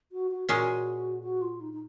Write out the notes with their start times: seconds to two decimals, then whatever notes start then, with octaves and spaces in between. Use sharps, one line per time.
0.12 F#4
0.31 F#4
0.49 A#2 G#3 C#4 F#4 G#4
1.23 F#4
1.41 F4
1.60 D#4
1.73 D#4